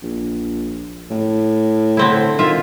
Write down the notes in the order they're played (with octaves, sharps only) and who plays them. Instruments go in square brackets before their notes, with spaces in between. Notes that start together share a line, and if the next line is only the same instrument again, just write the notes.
[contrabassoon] A#1
A2
[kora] D3 C4 E4
[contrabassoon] D#3 [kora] F4 E5